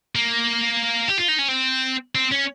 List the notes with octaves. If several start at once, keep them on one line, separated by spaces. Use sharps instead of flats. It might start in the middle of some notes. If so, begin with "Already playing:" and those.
A#3
G4
F4
D#4
C#4
C4
C4
C#4